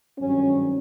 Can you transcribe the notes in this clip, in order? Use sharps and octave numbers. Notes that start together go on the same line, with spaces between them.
G#1 G2 D#3 F#3 C#4